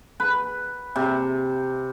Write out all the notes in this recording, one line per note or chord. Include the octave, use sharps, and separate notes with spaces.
B4
C3